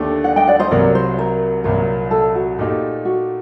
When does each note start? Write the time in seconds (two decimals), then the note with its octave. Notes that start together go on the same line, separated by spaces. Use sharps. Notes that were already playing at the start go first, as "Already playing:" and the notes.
Already playing: D#2 D3 A3 D4 G4
0.24 D5 F#5
0.36 D#5 G5
0.47 D5 F#5
0.59 C5 D#5
0.71 C2 C3 F#3 A#3 F#4 A#4 D5
0.95 C5
1.19 A#4
1.64 C2 A#2 F#3 A#4
2.11 A4
2.35 F#4
2.59 A#2 A3 D#4 G4
3.05 F#4